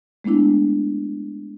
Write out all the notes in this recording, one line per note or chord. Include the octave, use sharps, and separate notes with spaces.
G#3 A3 B3 D4 E4